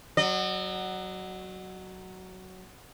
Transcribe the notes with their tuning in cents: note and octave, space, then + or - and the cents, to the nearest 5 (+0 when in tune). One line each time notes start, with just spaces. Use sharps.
F#3 +10 D#5 -40